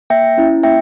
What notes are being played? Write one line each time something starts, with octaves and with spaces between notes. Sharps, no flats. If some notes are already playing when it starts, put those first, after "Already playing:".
A#3 E5 G5
C#4 E4
A#3 E5 G5